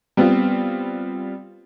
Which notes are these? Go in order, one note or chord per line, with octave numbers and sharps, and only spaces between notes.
G3 B3 C4 F4